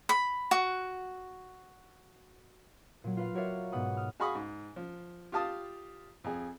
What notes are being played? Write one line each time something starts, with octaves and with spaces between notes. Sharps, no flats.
B5
F#4
A#2 F#3
F4 B4 F5
F#4 A#4 C#5 D5 E5 F5
G#2 B2 B3 F#5 B5 D#6
D#6 F6
F#4 G#4 F5 B5 C#6 D#6
G#2
F3
F4 G4 F5 A5 D#6
F2 G#4